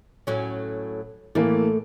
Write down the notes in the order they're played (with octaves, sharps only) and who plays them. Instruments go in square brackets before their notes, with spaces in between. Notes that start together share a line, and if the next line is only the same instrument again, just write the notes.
[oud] A2 F#3 C#4
[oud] A2 A3 [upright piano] E3 A#3